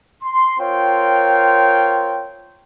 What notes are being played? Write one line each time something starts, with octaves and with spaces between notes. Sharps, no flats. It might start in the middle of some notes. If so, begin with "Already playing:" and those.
C6
C4 F4 A#4 C#5 G5